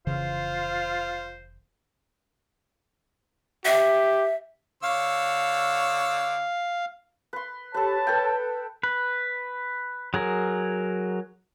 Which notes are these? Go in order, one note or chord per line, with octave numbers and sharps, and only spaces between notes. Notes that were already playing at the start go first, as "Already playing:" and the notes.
F1 C#3 E3 F4 C5
G4 E5
D3 C#5 F5 E6
B4 C6
G4 A4 B4 C#5 A5
A4 B4 G5
B4
F#3 G#4 A#4